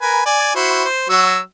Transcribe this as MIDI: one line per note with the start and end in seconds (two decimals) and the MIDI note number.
0.01 0.21 70
0.01 0.21 71
0.01 0.21 80
0.26 0.55 74
0.26 0.55 80
0.56 0.84 64
0.56 0.84 66
0.56 0.84 72
0.85 1.05 72
1.09 1.39 54
1.09 1.39 66
1.09 1.39 88